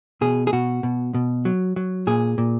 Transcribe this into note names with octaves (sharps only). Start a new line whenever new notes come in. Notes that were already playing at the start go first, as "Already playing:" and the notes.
B2 G#4
G#4
B2 F#4
B2
B2
F#3
F#3
A#2 G#4
A#2